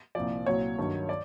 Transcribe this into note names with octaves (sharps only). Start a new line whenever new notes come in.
C2 A#2 F3 D5
C2 A#2 F#3 C#5
G2 D#3 F#3
D5